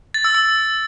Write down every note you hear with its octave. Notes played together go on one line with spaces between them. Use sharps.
A6
E6
E6